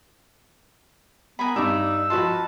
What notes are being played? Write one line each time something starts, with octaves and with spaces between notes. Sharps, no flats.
B3 A#4 G#5 B5
G2 G3 D#4 D5 A#5 C#6 E6
F3 D#4 F#4 B4 A5 B5 C6